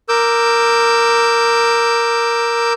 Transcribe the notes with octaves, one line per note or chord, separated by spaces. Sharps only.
A#4 D6 E6 G6